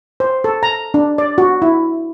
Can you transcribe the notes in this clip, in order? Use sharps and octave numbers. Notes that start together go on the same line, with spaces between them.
C5
A4
A#5
D4
D5
F#4
E4